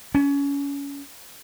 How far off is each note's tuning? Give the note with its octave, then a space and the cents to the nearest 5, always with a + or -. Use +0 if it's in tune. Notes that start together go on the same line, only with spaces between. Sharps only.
C#4 +25